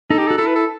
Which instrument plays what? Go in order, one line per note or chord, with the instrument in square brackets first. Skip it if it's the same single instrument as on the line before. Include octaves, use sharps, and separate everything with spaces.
[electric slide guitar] D#4 [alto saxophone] A4
[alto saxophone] G4
A4
[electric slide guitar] F#4
[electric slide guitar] E4 [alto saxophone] A4
[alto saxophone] B4
A4